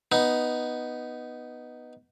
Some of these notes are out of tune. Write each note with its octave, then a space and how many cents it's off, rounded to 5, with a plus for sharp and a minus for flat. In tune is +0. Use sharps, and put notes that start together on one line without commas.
B3 +0 D#4 +0